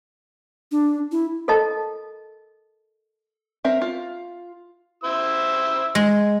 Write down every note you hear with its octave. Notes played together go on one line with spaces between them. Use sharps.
D4
E4
A4 A#4 D#5 A5
C4 A#4 E5
F4
E4 C5 E6
G#3